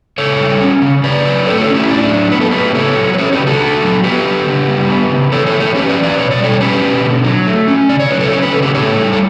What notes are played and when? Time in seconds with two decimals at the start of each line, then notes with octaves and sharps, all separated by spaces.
0.18 C#3 A4 C#5
0.40 G3
0.61 C#4
0.82 C#3
1.04 C#3 B4 D5
1.25 F#3
1.46 A3 A4 C#5
1.61 F#4 A4
1.67 C#4
1.75 E4 G4
1.89 A2 D4
2.10 F#3
2.32 B3 B4
2.41 A4
2.51 A2 G4 B4
2.74 C#3 A4 C#5
2.96 F#3
3.14 B4
3.18 C#4 A4 C#5
3.32 G4 B4
3.39 C#3
3.47 F#4 A4
3.61 D3
3.82 F#3
4.04 B3 G4 B4
4.25 D3
4.47 C#3
4.68 G3
4.89 B3
5.10 C#3
5.32 E3 A4 C#5
5.46 A4 C#5
5.54 A3
5.60 A4 C#5
5.75 C#4 G4 B4
5.89 B4 D5
5.96 E3
6.03 B4 D5
6.18 B2 C#5
6.31 D5
6.39 G3 A4 C#5
6.60 C#4 G4 B4
6.82 B2
7.03 D3
7.24 F#3
7.47 A3
7.68 C#4
7.89 C#3 D5
8.00 C#5
8.10 F#3 B4
8.20 A4 C#5
8.32 C#4 C#5
8.42 B4
8.53 C#3 A4
8.62 G4 B4
8.74 A2 A4 C#5
8.96 G3
9.13 A4